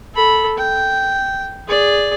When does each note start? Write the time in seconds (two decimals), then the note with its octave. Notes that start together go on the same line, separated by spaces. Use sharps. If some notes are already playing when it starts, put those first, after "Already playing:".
0.15 A4 B5
0.58 G5
1.68 G#4 D5